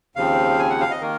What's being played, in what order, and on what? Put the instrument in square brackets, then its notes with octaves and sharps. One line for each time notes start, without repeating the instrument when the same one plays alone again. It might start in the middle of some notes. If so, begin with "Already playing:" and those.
[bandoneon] D#2 C#3 F3 C4 F5
G#5
F#5
F5
D#5
D#3 A#3 A#4